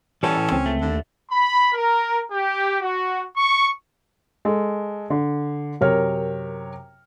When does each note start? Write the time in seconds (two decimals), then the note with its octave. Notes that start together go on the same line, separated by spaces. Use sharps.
0.23 E3 G3 C#4 A4 B4 F#5
0.37 A2
0.52 C#2 C4
0.66 A3
0.81 D#2 D3
1.30 B5
1.73 A#4
2.31 G4
2.81 F#4
3.36 C#6
4.45 G#3 A4
5.10 D3
5.81 F#2 C3 A#4 C#5 F6